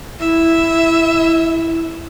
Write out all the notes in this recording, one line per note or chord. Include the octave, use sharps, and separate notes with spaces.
E4 E5